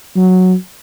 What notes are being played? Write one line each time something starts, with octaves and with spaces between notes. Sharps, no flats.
F#3